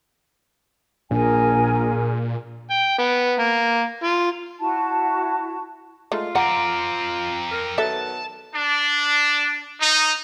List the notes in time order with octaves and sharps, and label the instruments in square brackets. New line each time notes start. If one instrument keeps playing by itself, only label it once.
[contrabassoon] A#1 [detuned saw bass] A#2 [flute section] G#4 A#4 G#5
[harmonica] G5
B3
A#3
F4
[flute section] E4 F#4 A5
[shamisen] G#3 A3 D#4 [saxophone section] F4
[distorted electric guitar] F2 C4 [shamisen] F#5 [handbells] A#5 D6 D7
[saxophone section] A#4
[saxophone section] D#3 F#3 B3 [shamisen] A4 E5 [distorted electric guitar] A5
[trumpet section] D4
D#4